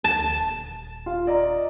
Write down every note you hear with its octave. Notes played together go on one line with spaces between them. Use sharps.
D2 A5
D#1
F4
D5 D#5 A#5